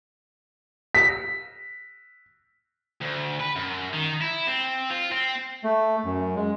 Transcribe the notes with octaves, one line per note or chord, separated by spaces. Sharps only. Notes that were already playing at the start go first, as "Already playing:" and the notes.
B6
D2
B4
F#2
D#3
E4
C4
F4
C4
A3
F#2
G#3